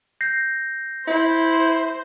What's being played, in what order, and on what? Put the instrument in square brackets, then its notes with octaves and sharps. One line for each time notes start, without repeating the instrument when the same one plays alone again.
[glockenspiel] G6 A#6 C7
[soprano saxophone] E4 [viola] C5